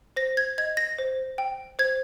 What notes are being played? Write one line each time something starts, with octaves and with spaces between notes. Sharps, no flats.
C5 A#6
G#6
D#5 G#6
A#6
C5
G5
C5 G#6